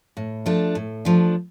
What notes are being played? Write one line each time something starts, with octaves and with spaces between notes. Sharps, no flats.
A2
F3 A3 D4
A2
F3 A3 D4